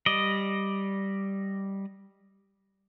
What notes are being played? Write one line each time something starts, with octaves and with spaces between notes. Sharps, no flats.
G3 D5 D#5